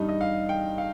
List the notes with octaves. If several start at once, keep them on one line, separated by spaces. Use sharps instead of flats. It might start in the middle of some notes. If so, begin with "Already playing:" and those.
Already playing: G2 G3 D#4
D#5
F5
G5
F5